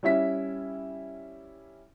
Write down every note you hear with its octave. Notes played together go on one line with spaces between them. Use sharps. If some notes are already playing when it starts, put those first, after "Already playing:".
G3 C#4 E4 E5 B6